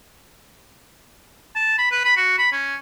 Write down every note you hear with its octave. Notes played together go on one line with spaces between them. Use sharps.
A5
B5
B4
B5
F#4
B5
C#4